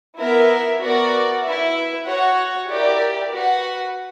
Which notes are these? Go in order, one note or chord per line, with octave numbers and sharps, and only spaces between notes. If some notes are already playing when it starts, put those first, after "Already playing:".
B3 E4 A#4 E5
B3 F#4 A#4 D5 F#5
E4 B4 E5
F#4 C#5 F#5
E4 G4 A#4 D5
F#4 B4 F#5